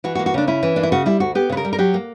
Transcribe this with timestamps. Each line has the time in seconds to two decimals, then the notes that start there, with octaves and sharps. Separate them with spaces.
0.04 E3 F#4
0.15 F#4
0.19 A#3
0.26 F#4
0.34 C#3 D4
0.48 C#4 E4
0.63 E3
0.76 A#3 D4
0.83 E4
0.92 C#3 F#4
1.06 G3 E4
1.20 D2 F#4
1.35 B3 G4
1.49 C#3 B4
1.57 A#4
1.65 G3
1.73 A#4
1.78 F#3 G4
1.94 A#3